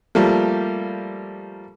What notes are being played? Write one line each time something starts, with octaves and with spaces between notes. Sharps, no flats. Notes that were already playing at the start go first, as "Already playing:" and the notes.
F3 G3 A3 A#3